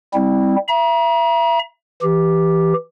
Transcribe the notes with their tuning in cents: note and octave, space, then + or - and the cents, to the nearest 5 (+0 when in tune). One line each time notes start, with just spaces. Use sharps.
G3 +20 C4 +0 E4 -20
E5 +35 A#5 +40
E3 +0 G4 +0